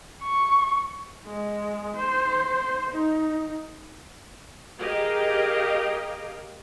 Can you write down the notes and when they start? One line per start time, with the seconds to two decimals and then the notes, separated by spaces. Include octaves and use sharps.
0.23 C#6
1.26 G#3
1.97 C5
2.91 D#4
4.79 G4 G#4 A#4 D#5 F5 G5